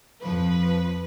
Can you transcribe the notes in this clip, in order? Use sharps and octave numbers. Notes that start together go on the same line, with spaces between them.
F2 F3 B4